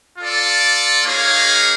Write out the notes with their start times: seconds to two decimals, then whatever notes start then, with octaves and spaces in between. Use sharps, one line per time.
0.19 F4 A4 D5
1.05 A#3 D#4 G#4 C#5 F5